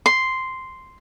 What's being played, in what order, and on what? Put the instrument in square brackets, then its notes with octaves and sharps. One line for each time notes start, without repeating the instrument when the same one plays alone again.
[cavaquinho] C6